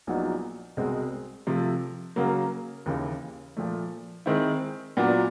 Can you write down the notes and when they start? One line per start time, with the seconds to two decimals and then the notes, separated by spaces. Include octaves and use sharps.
0.07 A#1 A#2 F#3 B3 D#4
0.77 C2 B2 G#3 C4
1.47 C3 F3 A3
2.16 C#3 F#3 A#3
2.86 D#2 C#3 E3
3.57 A#2 F3 A3
4.26 D#3 G#3 C4 E4
4.97 A#2 F#3 B3 D4